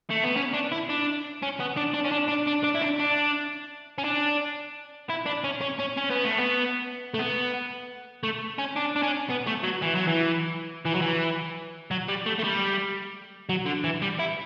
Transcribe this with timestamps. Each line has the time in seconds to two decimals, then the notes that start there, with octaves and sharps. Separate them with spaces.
0.10 A3
0.24 B3
0.37 C#4
0.54 D4
0.72 E4
0.90 D4
1.42 C#4
1.60 B3
1.77 D4
1.94 D4
2.05 C#4
2.12 D4
2.29 D4
2.47 D4
2.64 D4
2.75 E4
2.82 D4
2.99 D4
3.98 C#4
4.04 D4
5.10 E4
5.26 D4
5.44 C#4
5.61 C#4
5.79 C#4
5.97 C#4
6.10 B3
6.25 A3
6.38 B3
7.14 A3
7.19 B3
8.23 A3
8.59 C#4
8.76 D4
8.96 D4
9.03 C#4
9.30 B3
9.47 A3
9.63 F#3
9.82 E3
9.95 F#3
10.07 E3
10.86 E3
10.95 F#3
11.02 E3
11.91 F#3
12.08 G3
12.26 A3
12.39 A3
12.44 G3
13.49 F#3
13.66 D3
13.84 E3
14.02 G3
14.19 E4